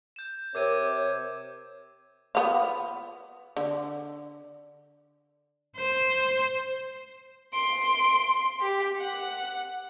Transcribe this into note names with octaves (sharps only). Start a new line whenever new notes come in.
G6 E7
C3 A#4 C#5 D6 G#6 D#7
B3 F4
D3
C5
C6 D7
G4
F#5 C#7